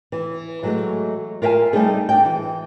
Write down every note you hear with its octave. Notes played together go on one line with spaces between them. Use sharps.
E3
E3 F#3 G#3 A3
F4 A#4 E5 G5 G#5
G3 A3 C4 D#4 G#4
D4 F#4 G5
E3